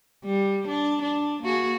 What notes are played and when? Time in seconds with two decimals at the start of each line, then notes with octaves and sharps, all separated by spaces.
0.24 G3
0.67 D4
1.02 D4
1.42 A#3 F#4 G#4